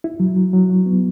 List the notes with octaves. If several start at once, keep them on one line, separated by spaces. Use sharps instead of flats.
E4
F#3
F#3
F#3
F#3
B3